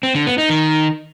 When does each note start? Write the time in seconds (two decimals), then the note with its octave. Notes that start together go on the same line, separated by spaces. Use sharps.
0.03 C4
0.15 D3
0.26 B3
0.38 D#4
0.50 D#3